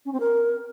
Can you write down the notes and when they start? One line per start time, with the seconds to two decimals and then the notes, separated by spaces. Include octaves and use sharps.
0.05 C#4
0.13 C4
0.20 A#4